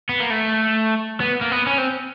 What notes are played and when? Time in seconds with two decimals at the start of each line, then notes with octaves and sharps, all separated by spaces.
0.09 B3
0.20 A#3
0.30 A3
1.20 B3
1.41 A#3
1.51 B3
1.67 C#4
1.78 C4